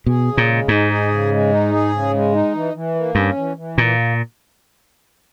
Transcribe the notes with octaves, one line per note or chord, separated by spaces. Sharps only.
B2 G#4
C#3
A#2
G#3
G#2 D#4
G#4
C#3
G#3
D#4
G#4
C#3
G#3
D#4
E3
E3
A#3
G2 C#4
E3
E3
A#2 A#3